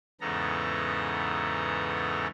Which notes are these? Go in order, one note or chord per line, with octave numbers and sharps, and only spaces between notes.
E2 G#2 C#3 B3 A4 A#5